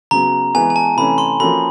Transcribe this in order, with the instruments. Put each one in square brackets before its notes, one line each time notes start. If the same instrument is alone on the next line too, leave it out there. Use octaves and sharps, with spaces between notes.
[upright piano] C#3 F#3 B3 [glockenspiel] A#5
[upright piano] E3 G#3 B3 [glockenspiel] G#5
[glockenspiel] G#5
A5
[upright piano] C3 E3 A3 C#4 [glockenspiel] B5
[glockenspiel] C6
[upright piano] F3 A#3 C#4 F#4 A4 [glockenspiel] B5